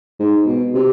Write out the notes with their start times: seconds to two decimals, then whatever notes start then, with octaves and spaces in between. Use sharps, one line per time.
0.19 G#2
0.46 B2
0.74 C3